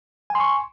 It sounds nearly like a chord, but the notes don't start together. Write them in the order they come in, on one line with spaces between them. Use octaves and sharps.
G#5 C6 C#6